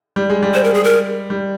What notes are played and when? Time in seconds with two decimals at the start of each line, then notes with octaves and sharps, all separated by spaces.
0.16 G3
0.30 G#3
0.43 G3
0.54 C5
0.64 A#4
0.74 G#4
0.84 A#4
1.30 G3